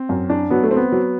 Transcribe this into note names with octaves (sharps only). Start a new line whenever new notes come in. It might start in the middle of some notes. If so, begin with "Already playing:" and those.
Already playing: C4
F#2
D4
F#3 B3
A3
C4
B3
F#3